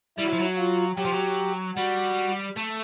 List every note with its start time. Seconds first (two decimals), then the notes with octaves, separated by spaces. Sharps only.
0.18 G3 E4
0.25 F#3
0.33 F3
0.39 F#3
0.58 F4
0.96 F#3 G4
1.05 F3
1.12 F#3
1.76 G3 F#4
2.56 A3